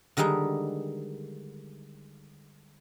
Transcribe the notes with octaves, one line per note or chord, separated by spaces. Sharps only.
D3 D#3 G3 G#3 D#4